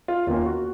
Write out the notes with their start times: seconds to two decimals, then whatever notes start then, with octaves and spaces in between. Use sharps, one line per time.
0.08 F4
0.27 D#2 D#3 A#3 C#4 F4
0.46 F#4